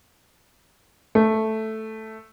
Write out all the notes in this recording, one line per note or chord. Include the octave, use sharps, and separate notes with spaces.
A3